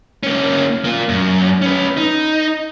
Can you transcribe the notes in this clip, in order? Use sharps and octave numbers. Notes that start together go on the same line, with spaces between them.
A#3 C#4
A#3 F4
F#2
C#4 B4
D#4